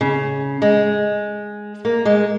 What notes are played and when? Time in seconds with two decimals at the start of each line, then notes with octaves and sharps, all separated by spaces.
0.01 C#3
0.62 G#3
1.85 A#3
2.05 G#3